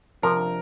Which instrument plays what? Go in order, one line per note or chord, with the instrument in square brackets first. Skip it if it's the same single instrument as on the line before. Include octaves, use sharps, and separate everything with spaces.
[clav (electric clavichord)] C3 F3 D4 [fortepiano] A#4